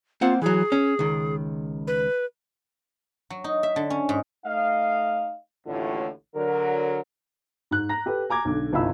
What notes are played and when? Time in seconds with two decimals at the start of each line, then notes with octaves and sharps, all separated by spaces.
0.21 A#3 C4 F4 F#5
0.42 E3 F#3 G#4
0.72 C#4
0.99 C#2 D#3
1.88 B4
3.30 F#3
3.44 D#4
3.63 E5
3.76 D3
3.90 C#4
4.09 G#2
4.45 A3 D#4 D#5 F5
5.67 A1 D#2 A2 D3 F4 C#5
6.35 D3 F#3 A#4
7.71 G#2 F#6
7.89 A#5 A#6
8.06 G4 A4 B4
8.30 G#5 A#5 D6 G#6
8.45 B1 D3 D6
8.73 G1 C2 D#4 F4 B5 E6